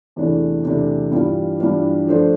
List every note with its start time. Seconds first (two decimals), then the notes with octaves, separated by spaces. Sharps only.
0.16 E2 C3 E3 A3 D4
0.64 E2 C3 E3 A3 D4
1.11 G2 E3 G3 D4 F4
1.59 G2 E3 G3 D4 F4
2.06 F3 A3 D4 A4 C5